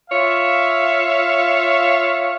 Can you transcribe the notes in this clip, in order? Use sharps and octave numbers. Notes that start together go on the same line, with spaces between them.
F4 C#5 E5 F5